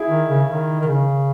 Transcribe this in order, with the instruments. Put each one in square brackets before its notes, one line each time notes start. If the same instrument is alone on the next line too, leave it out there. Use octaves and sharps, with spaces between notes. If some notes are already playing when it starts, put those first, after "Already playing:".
Already playing: [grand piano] E4 G#4
[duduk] D#3
C#3
D#3
D#3
C#3